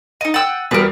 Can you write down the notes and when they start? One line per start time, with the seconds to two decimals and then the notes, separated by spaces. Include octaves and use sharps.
0.21 D#4 D#5 D#7
0.34 F#5 G5 E6 A6
0.71 E2 B2 G3 A#4 B4